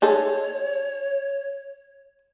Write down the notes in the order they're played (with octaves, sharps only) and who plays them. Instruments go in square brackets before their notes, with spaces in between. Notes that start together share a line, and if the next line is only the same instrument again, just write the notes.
[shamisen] D#4 G#4 A4 [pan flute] C#5